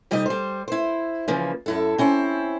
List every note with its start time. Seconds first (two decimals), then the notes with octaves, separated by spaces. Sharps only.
0.11 C3 G3 D#4 G4 D#5
0.26 G3 C5
0.68 E4 C5
1.28 C#3 E3 F3 A#3
1.66 F#2 E4 A4
1.98 C4 C#4 E4 C5